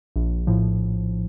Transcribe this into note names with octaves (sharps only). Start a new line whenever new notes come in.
A#1
A2 F3